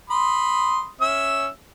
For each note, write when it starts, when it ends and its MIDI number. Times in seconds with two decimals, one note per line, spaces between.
0.10 0.88 83
0.10 0.88 84
0.10 0.88 87
1.01 1.48 61
1.01 1.48 76
1.01 1.48 88